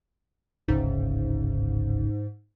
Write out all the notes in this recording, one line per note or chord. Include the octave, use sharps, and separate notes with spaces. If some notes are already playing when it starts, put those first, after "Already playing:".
D1 G#1 G#2 C#3